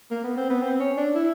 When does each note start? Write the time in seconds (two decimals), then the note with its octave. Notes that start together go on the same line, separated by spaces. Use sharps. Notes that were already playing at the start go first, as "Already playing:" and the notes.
0.11 A#3
0.24 B3
0.37 C4
0.50 B3
0.62 C4
0.80 C#4
0.97 D4
1.14 E4